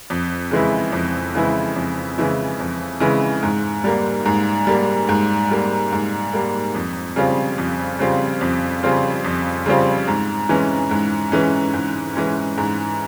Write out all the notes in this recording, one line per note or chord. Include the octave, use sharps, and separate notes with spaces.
F2
C#3 E3 G#3 E4
F2
C#3 E3 G#3 E4
F2
C#3 E3 G#3 E4
F2
C#3 E3 G#3 E4
G#2
G3 A#3
G#2
G3 A#3
G#2
G3 A#3
G#2
G3 A#3
F2
C#3 G3 C4 F4
F2
C#3 G3 C4 F4
F2
C#3 G3 C4 F4
F2
C#3 G3 C4 F4
G#2
E3 G#3 C#4
G#2
E3 G#3 C#4
G#2
E3 G#3 C#4
G#2